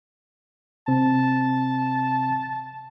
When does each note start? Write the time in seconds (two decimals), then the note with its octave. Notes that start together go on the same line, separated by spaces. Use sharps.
0.88 C3 C4 A5